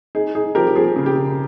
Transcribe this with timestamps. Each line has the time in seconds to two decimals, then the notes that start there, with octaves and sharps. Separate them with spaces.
0.15 D#4 G#4
0.35 D#4 G#4
0.55 F3 G4 A#4
0.67 G4
0.75 F3 G#4
0.96 C#3
1.06 G4
1.16 C#3